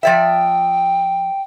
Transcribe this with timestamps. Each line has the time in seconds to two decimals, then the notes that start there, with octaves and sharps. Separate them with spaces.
0.03 F3 D5 E5 G5